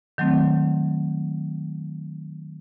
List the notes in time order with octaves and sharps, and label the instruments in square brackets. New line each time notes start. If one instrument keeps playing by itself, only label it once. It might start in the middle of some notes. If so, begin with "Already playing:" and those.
[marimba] D#3 F#3 A3 C4